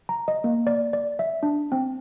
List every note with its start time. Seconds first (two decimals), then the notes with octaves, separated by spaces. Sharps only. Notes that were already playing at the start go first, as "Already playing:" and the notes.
0.09 A#5
0.28 D#5
0.44 A#3
0.67 D5
0.93 D5
1.19 E5
1.43 D4
1.72 C4